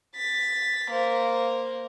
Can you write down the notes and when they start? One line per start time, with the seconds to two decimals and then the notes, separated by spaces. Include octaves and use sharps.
0.16 A6 B6
0.91 A#3 C5